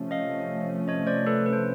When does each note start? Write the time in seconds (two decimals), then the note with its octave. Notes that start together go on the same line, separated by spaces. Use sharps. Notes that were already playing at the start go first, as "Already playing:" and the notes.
Already playing: C3 F3 A3 C#4
0.11 D#5 F5
0.88 C#5 D#5
1.07 C5 D5
1.26 A4 B4
1.46 B4
1.53 C5